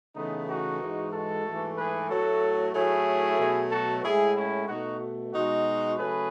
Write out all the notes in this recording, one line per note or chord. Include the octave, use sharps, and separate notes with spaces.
C#3 E3 A3 B3 D#4
D#4 F#4
G#2 E3 G#3
F#4 A4
G#2 E3 A3
G#4 B4
A2 F#3 A3 F#4 A4
A2 F#3 A3 E4 G#4
B2 F#3 A3
F#4 A4
A2 G#3 E4 G#4
C#4 E4
B2 A3 D#4 F#4
B2 G#3 D#4 F#4
C#3 F#3 A3 G#4 B4